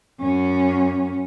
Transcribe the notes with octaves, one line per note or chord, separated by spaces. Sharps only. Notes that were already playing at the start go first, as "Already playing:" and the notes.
F#2 C#4